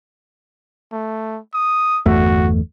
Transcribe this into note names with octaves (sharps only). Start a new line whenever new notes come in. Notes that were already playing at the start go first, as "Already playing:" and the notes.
A3
D#6
G1 E2 A3 F#4